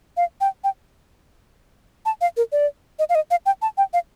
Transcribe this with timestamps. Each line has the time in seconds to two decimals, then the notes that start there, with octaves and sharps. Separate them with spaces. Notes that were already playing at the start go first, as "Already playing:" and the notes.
0.17 F5
0.41 G5
0.64 G5
2.06 A5
2.21 F5
2.37 A#4
2.52 D5
2.99 D#5
3.09 F5
3.15 D#5
3.31 F5
3.46 G5
3.62 A5
3.78 G5
3.93 F5